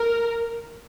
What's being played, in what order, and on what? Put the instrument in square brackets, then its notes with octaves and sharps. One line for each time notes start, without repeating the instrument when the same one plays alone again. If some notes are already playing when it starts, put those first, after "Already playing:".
Already playing: [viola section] A#4